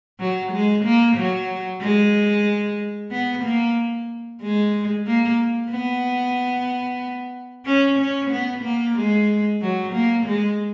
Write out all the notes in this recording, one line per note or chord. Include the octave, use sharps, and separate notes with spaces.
F#3
G#3
A#3
F#3
G#3
B3
A#3
G#3
A#3
B3
C#4
C#4
B3
A#3
G#3
F#3
A#3
G#3